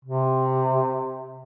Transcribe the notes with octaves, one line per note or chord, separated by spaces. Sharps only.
C3